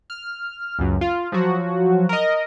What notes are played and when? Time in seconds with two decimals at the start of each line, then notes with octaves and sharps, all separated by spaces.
0.10 F6
0.79 C#2 F#2
1.01 F4
1.32 F3 F#3 F#4
2.09 A#4 D#5